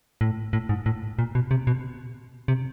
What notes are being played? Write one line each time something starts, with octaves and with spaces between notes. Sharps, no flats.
A2
A2
G#2
A2
A#2
B2
C3
B2
C3